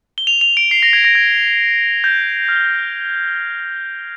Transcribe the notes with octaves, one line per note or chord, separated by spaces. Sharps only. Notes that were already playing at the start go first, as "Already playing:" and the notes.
G7
F7
F7
D7
C7
A#6
G#6
A#6
G#6
G6
F6